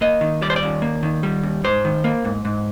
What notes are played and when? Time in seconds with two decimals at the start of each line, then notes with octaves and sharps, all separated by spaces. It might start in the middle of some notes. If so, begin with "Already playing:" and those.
0.01 A#3 D#5
0.21 D#3
0.42 G3 D5
0.50 C5
0.56 D5
0.63 D#2
0.82 A#3
1.03 D#3
1.23 G3
1.43 D#2
1.64 G#2 C5
1.85 D#3
2.04 A#3
2.25 G#2
2.45 G#2